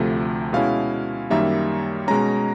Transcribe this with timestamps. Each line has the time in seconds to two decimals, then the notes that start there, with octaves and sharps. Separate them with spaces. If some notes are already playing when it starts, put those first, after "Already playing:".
Already playing: D2 C3 F3 A3
0.53 B2 G#3 C#4 E4 F5
1.30 F#2 D#3 G3 A#3 E5
2.08 B2 G#3 C#4 A#5